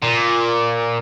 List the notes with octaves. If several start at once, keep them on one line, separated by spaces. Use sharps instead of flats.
A#2